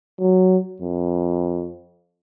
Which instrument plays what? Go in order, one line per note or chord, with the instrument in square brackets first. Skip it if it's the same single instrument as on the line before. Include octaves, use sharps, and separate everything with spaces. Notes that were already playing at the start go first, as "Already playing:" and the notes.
[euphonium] F#3
F2